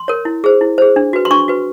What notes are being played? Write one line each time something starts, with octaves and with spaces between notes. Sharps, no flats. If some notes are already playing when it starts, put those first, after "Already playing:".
Already playing: C6
A#4 C#5
E4
G#4 C5
E4
G#4 C5
D4
F#4 B4
C6
D4 C#6
F#4 B4